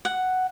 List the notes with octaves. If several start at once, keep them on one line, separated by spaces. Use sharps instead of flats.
F#5